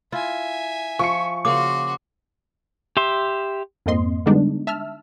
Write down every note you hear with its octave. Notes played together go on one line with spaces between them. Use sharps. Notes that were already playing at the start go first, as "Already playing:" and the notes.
E4 F4 E5 G#5
F3 C#6 C#7
C#3 A#3 F#4 F5 C6 D6
G4 E5 C6
F2 G#2 A#3 C4 D#5 C6
D3 G3 G#3 B3 D4 D#4
E5 A5 E6 F6